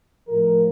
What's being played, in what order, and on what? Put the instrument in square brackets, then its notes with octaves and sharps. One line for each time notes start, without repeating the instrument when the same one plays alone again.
[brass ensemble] A2 F3 A#4